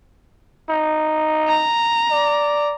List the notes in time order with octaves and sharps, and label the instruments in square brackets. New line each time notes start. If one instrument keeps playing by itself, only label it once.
[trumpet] D#4
[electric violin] A#5
[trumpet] D5